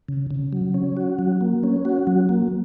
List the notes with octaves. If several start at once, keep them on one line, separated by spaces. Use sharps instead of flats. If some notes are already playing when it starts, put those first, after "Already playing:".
C#3
C#3
F#3
C#4
F#4
F#3
A#3
C#4
F#4
F#3
A#3